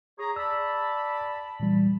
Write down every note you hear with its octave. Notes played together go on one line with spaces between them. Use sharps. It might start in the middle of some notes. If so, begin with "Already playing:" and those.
G#4 C#5 A#5
D5 A5 B5 E6
A#2 E3 G3